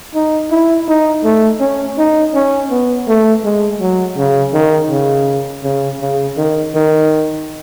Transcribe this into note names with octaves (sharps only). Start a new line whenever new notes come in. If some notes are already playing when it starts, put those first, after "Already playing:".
D#4
E4
D#4
A3
C#4
D#4
C#4
B3
A3
G#3
F#3
C#3
D#3
C#3
C#3
C#3
D#3
D#3